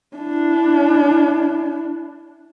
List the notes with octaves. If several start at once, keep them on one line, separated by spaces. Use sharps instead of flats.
D4 E4